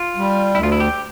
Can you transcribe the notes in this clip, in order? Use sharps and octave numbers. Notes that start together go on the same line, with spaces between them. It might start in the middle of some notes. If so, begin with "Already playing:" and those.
Already playing: F4
G3
D2 E4
F4
E4
G4